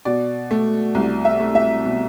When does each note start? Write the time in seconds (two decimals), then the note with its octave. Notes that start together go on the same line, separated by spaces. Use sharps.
0.05 B2 D5
0.51 A3
0.95 C2
1.25 E5
1.40 A3
1.55 E5
1.85 B2